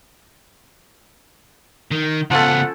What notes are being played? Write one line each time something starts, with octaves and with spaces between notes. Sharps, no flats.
D#3
C#3 F3 B3 C#4 A4 F#5